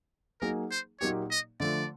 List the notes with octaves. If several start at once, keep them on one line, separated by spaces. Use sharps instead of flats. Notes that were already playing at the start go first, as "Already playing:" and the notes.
F#3 A#3 D#4 G#4 A#4
C5
A#2 F#3 A#3 D#4 G4 C#5
D#5
D3 F3 A3 D5